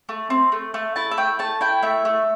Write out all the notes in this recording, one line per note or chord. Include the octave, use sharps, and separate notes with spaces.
A3
C4
A3
A3
E4 A5
E5
A3 G5
A3 A5
E4 G5
A3 E5
A3